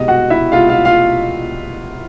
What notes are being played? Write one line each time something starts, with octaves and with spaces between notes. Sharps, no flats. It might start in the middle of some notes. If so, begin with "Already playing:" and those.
Already playing: C2 B2 G#3 D#5
F#4 F#5
E4 E5
C2 B2 G#3 F4 F5
F4 F5
F4 F5